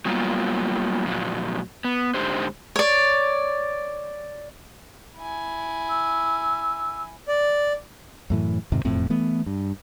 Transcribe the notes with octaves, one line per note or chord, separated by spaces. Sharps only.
F#3 G3 A#3 B3 F4
F2 A#2 F#3
B3
G#2 D3 G4 C5
C#5 D5
E4 G#5
E6
D5
F#2 A2 E3
F2 G#2 C3 D#3
E1 F2 A2 C4
E3 A3 B3
G2